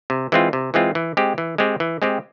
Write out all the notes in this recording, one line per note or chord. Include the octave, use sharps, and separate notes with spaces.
C3
E3 G#3 C4 F4
C3
E3 G#3 C4 F4
E3
G#3 C4 G4
E3
G#3 C4 G4
E3
G#3 C4 G4